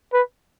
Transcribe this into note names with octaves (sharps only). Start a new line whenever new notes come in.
B4